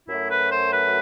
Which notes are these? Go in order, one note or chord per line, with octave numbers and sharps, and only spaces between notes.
F#2 F#3 A3 E4
B4
C5
B4